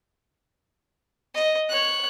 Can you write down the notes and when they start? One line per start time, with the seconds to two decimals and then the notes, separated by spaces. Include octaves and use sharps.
1.35 D#5
1.70 C#5 F#6